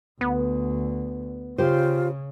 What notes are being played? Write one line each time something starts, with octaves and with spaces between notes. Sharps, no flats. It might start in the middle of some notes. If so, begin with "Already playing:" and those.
D2 B3
C#3 F4 G4 C5